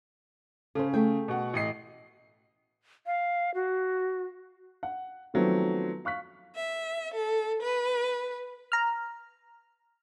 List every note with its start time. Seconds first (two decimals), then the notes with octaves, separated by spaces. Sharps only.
0.75 C#3 C#4 A4 C5
0.94 A3 G#4 G5
1.28 B2 F#5
1.54 A1 D#5 C7
3.06 F5
3.55 F#4
4.83 F#5
5.34 D#3 F3 F#3 A3 B3 C4
6.05 F5 C#6 F#6 B6
6.56 E5
7.14 A4
7.63 B4
8.72 A#5 F6